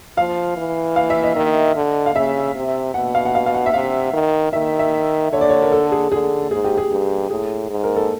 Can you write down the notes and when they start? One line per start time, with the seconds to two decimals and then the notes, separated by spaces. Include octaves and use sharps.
0.17 F3 F5
0.57 E3
0.96 F5
1.10 E5
1.23 D#5
1.36 D#3 D#5
1.76 D3
2.06 F5
2.15 C#3 E5
2.55 C3
2.94 B2 F#5
3.15 F5
3.25 F#5
3.35 F5
3.46 F5
3.54 F#5
3.66 E5
3.74 C3 F5
4.14 D#3
4.53 D#3 E5
4.79 E5
5.32 D3 C#5
5.41 D5
5.49 C#5
5.62 A#4
5.72 A4
5.92 G#4
6.12 D3 G#4
6.51 G#2 G#4
6.64 G4
6.77 G#4
6.91 G2
7.30 A2 G#4
7.70 G#2
7.84 A#4
7.96 A4